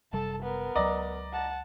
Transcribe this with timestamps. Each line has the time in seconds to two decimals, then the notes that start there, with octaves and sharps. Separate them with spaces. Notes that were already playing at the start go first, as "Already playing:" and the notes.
0.13 F#1 C3 G3 A4 A5
0.42 B3 A#4
0.75 C#2 F#3 D5 D#5 A#5
1.32 F#5 A5